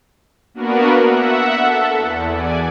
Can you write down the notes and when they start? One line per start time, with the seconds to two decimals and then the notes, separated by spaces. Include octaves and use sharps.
0.54 A#3 B3 D4 F#4 A#4 B4
1.00 E5 F#5
1.55 A4
1.95 E2
2.31 D5 G#5